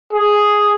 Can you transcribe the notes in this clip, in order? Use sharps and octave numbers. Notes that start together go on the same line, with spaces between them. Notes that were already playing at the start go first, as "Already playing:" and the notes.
G#4